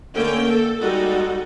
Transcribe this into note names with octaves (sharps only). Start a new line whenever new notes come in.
D3 A3 A#3 C#4 G5
A4
G3 G#3 D#4 F#4 A4 F#5